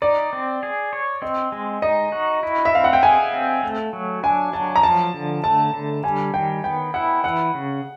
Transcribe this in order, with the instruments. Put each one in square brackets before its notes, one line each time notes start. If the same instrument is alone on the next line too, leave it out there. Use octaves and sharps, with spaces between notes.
[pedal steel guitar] D#4 [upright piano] D5
[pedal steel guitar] C4
G#4
C#5
[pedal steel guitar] C4 [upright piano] D#5
[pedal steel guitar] G#3
[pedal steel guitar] D#4 [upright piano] D#5
[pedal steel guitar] F#4
E4
[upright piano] E5
[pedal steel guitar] C4 [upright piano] F5
[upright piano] F#5
G5
[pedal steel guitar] G#4 [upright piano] G#5
[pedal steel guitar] C4
A3
F#3
[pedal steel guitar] D4 [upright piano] G#5
[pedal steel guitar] F#3 [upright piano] A5
[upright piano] A#5
[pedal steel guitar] F3 [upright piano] A5
[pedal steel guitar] D3
[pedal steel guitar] A3 [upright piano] A5
[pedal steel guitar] D3
[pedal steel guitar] G3 [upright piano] G#5
[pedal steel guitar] D#3 [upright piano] G5
[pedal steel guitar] B3 [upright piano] G5
[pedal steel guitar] E4 [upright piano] F#5
[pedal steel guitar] E3 [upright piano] F#5
[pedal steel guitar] C#3